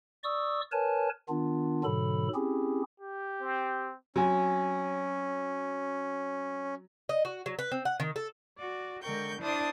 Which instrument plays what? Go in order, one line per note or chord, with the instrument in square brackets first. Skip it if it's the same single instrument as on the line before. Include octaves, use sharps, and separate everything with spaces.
[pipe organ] D5 C#6 D#6 E6
A#4 B4 C#5 G#5 A5
D#3 B3 D4 F4
G#2 B2 D3 F#3 A4 B5
C4 C#4 E4 G4 G#4
[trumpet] G4
[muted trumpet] C4
[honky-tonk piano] F#3 [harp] C4 G#5 [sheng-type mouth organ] C#4
[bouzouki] D#5
F#4
F#3
B4
C4
F#5
D#3
A4
[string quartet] F#4 D5
D3 G#3 A#4 G5 C#6 G6
D4 E4 C5 A5 D#6